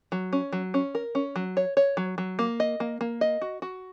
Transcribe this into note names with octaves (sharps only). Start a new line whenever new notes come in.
F#3
C#4
F#3
C#4
A#4
C#4
F#3
C#5
C#5
F#3
F#3
A#3
D#5
A#3
A#3
D#5
F#4
F#4